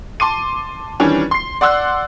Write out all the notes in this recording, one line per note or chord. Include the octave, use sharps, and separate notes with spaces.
A5 C6 D6 D#7
D#3 E3 G3 C#4 D4
C6 C7
D5 F#5 C6 E6 F#6